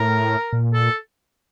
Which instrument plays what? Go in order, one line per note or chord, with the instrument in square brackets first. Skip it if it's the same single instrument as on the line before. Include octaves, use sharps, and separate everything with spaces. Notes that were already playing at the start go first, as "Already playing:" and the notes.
Already playing: [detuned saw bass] A2 [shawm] A#4
[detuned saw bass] A#2
[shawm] A4